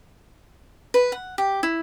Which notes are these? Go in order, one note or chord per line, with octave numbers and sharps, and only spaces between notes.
B4
F#5
G4
E4